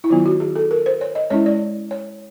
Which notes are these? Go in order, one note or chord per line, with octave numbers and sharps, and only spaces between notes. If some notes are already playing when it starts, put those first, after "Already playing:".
E4
D#3 F#3 B3 F4
F#4
G#4
A4
A#4
C5
C#5
D#5
G#3 C#4 E4 C#5
D5
C#5